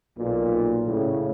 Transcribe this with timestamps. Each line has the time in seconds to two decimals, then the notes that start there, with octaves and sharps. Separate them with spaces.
0.18 B1 A#2
0.87 A2 C#3